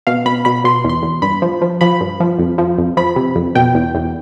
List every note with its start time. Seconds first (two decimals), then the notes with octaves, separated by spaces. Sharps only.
0.07 B2 F5
0.26 B2 B5
0.45 B2 B5
0.64 B2 C6
0.85 E2 C6
1.03 E2
1.22 G2 B5
1.42 F3
1.62 F3
1.81 F3 B5
2.01 G2
2.20 F3
2.39 F2
2.58 F3
2.78 F2
2.97 F3 B5
3.16 C3
3.36 F2
3.55 B2 G5
3.75 E2
3.95 E2